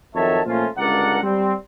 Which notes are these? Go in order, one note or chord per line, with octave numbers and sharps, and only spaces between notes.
F2 D#3 F#3 C#5 E5 A5
A#2 F3 A3 C#4 F4
C#2 G2 D3 A#4 D5 F#5
G3 C4